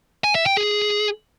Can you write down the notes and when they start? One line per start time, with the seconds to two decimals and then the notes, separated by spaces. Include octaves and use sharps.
0.24 G#5
0.35 E5
0.46 G5
0.57 G#4